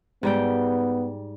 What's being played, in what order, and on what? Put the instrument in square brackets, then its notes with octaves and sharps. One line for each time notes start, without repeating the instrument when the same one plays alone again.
[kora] G#2 G3 G5 [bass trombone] B3